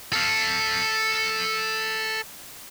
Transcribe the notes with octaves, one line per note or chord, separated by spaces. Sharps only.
A4 F5